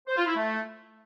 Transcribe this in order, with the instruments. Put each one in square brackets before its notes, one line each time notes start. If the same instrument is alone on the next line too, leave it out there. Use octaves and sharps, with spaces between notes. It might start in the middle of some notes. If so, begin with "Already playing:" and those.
[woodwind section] C5
F4
E4
A3